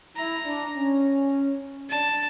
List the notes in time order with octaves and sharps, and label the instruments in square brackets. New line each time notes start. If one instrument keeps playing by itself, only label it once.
[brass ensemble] E4 [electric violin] A#5
[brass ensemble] D4
C#4
[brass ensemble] D4 [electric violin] A5